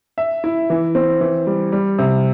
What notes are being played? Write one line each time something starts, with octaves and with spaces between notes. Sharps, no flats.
E5
E4
E3
C4
E3
G3
G3
C3